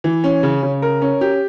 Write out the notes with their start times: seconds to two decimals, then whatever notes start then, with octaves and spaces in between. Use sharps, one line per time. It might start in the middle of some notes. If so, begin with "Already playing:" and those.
0.04 E3
0.24 C#4
0.43 C#3
0.63 C#3
0.82 A#4
1.02 C#4
1.21 G4